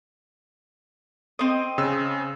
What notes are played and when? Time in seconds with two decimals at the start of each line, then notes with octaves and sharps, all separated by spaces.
1.39 C4 D#5
1.78 C#3 E6